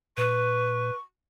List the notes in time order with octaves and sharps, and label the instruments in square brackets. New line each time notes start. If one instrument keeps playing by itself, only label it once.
[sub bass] A#2 [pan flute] B4 [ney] C#6